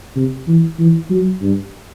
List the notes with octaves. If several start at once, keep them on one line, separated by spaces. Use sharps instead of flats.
C3
E3
E3
F#3
G2